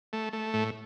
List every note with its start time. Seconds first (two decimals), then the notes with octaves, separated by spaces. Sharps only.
0.13 A3
0.33 A3
0.54 A2